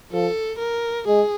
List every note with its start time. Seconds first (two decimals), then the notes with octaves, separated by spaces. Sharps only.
0.12 F3 A4
0.59 A#4
1.07 G#3 G#4